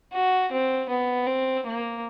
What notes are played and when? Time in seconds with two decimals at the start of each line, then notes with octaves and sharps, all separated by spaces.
0.13 F#4
0.52 C4
0.90 B3
1.27 C4
1.66 A#3